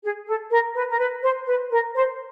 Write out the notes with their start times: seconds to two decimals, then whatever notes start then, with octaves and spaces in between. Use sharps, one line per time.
0.03 G#4
0.27 A4
0.51 A#4
0.75 B4
0.90 A#4
0.99 B4
1.22 C5
1.46 B4
1.71 A#4
1.94 C5